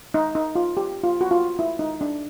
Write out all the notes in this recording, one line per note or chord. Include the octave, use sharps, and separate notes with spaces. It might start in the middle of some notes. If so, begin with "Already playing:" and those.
D#4
D#4
F4
G4
F4
F#4
F4
E4
D#4
D4